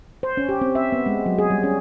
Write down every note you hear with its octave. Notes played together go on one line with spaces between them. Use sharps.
C5
C#4
G4
C4
E5
B3
G#3
F#3
G#4
G3
C#4